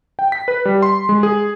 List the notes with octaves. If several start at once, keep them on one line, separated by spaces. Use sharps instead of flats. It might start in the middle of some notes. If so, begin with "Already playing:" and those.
G5
B6
B4
G3
C6
G#3
G#4